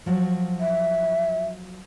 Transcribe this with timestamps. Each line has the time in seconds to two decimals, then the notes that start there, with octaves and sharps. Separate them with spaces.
0.06 F3 F#3
0.60 E5